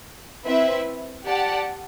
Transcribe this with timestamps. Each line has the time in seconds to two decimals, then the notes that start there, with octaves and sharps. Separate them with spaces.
0.44 C4 E4 B4 E5
1.25 G4 D5 F#5 A5